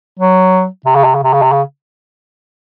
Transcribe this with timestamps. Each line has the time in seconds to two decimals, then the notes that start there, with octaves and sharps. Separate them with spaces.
0.19 F#3
0.86 C3
0.95 C#3
1.04 C3
1.15 C#3
1.23 C3
1.33 C#3
1.42 C3
1.52 C#3